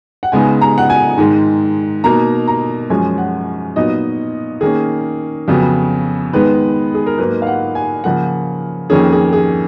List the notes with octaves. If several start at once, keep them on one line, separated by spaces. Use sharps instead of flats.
F#5
C#3 G#3 B3 D#4 G#5
A#5
F#5
G#5
G#2 D#3 G#3
B2 A#3 D#4 A#5
A#5
F#2 F3 G#3 C#4 G#5
F#5
A#2 F#3 B3 D#4 D#5
D#3 A#3 C#4 G#4
F2 C#3 F#3 B3
D#3 G#3 B3 D#4 B4
G#4
A#4
G#2 F#3 A#3 D#4 B4
F5
F#5
G#5
C#3 F3 A#3 F#5
F2 D#3 A#3 C#4 G#4
G#4
G#4